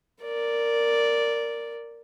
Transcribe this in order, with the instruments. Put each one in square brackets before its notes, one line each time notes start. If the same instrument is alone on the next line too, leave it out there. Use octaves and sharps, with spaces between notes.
[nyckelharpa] A#4 D5